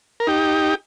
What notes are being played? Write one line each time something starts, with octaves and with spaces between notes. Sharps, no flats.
A#4
D#4 G4